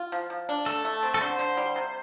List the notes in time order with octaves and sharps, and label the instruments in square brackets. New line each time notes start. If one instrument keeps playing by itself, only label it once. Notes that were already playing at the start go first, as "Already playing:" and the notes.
Already playing: [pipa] F4
F3
F3
D4
[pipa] A3 [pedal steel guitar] A4
[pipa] A3
C4
[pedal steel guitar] A4
[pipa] D3 [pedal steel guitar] C5
[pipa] D3
G3
C3